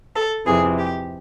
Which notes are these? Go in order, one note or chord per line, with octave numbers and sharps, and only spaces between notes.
A4
F2 C3 E3 G#4
G4